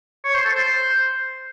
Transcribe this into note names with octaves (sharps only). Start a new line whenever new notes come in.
C#5
C5
A4
C5